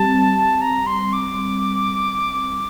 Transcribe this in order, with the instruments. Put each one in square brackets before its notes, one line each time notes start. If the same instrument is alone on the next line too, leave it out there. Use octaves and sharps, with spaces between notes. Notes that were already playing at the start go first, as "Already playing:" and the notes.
Already playing: [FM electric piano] G3 C4 [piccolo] A5
[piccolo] A#5
C6
D6